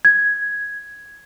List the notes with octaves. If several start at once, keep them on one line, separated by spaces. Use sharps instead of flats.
G#6